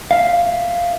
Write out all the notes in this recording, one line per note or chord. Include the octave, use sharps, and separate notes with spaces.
E5 F5